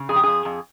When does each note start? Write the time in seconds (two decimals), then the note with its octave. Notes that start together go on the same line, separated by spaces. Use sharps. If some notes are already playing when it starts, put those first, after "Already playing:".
Already playing: C#3
0.09 F2 G#4
0.16 G4
0.24 F2 G#4
0.45 F2